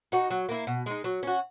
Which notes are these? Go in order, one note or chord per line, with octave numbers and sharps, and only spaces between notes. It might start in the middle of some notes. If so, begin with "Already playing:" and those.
D#4 F#4
F#3
A#3 E4
B2
G#3 D#4
F#3
C#4 F#4